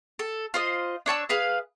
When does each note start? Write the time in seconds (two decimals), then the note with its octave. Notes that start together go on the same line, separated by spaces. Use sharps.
0.19 A4
0.54 F4 C5 D#5
1.06 D4 C#5 A5 E6
1.29 G#4 B4 F5